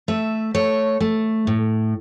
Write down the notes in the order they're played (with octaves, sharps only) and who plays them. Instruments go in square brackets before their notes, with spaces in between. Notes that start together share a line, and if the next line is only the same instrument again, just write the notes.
[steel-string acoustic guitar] A3 E5
A3 C#5
A3
A2